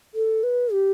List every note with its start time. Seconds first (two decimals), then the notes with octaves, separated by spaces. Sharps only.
0.15 A4
0.43 B4
0.73 G4